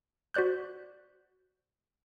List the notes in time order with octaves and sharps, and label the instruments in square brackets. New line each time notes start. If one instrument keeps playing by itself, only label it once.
[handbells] F#4 C5 D5 F#6 G6